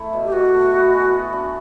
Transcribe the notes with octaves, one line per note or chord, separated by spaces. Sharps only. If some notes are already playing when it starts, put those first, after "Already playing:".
Already playing: A3 E4
B2
G4
B2 F#4
A3
B3
E3
B3
D4